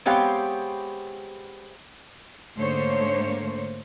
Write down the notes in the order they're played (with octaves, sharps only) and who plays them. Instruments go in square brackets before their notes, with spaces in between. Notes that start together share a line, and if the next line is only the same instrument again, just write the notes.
[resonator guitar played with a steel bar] G#3 B3 C4 G4 C#5 F5
[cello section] G#2 D3 A3 A#3 C5 C#5